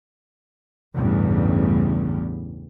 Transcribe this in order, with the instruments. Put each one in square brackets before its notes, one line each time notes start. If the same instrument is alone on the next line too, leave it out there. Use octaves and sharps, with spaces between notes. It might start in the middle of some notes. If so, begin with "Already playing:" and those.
[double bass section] A1 E2 G2 C#3 G3